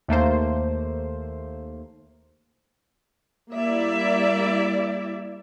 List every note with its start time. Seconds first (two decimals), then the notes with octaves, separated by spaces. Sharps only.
0.08 D#2 A3 A#3 C5
3.53 G3 A#3 E4 D5 E5